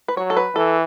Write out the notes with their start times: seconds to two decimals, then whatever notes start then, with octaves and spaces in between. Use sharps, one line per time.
0.08 B4
0.17 F#3 C#5
0.30 A4
0.37 B4
0.56 E3 A4